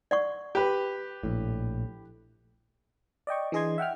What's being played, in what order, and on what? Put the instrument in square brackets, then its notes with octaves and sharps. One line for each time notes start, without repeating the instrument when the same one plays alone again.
[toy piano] D5 F#5 C#6
[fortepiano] G4 B4
[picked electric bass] A#1 A2
[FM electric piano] D5 D#5 G5 C#6
E3 D4 G#4 D#5 C6 G#6
E5 F#5 G5 F6